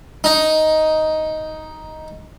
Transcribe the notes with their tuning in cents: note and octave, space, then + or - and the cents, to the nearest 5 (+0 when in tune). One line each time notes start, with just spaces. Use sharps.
D#4 +5